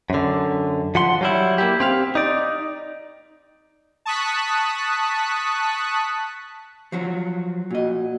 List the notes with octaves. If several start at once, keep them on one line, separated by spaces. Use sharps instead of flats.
F#2 D3
F3 F#5 C6
F#3 G3 E4
A#3 E4 G4
C4 G4 F5
D#4 D5
A5 C#6 D#6 F#6 B6
F3 F#3 F#4
A#2 F#4 D#5